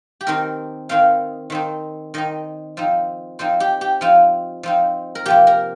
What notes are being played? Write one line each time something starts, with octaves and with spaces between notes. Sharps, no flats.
G4
D#3 C4 D#4 A#4
D#3 C4 D#4 F5
D#3 C4 D#4
D#3 C4 D#4 D#5
F3 C4 D#4
F3 C4 D#4 C5
G4
G4
F3 C4 D#4 F4
F3 C4 D#4
A#4
C3 F3 A#3 G4
A#4